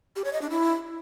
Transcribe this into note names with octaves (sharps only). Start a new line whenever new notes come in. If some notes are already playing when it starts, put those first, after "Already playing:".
G4
C#5
D#5
D4
E4